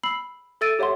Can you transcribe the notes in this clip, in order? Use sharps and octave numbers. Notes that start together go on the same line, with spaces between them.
B5 E6 C7 F#7
A4 E5 E6 A6 D7 D#7
G4 C#5 E5 F#5 C6